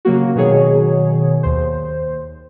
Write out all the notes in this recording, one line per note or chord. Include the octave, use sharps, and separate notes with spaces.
C#3 F#3 A#3 F#4
B2 D#3 F#3 G#4 C#5
D#2 C5